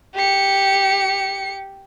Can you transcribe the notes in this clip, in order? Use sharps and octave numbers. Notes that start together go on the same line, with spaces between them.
G4 C#7